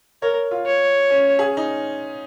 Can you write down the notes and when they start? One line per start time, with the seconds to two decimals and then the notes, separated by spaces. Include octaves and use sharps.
0.22 A#4 C#5
0.51 F4
0.66 C#5
1.10 C#4
1.39 G#4
1.57 D#4